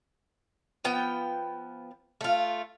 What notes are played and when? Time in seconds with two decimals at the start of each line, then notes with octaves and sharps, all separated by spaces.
0.84 F3 B3 G5
2.21 A3 F4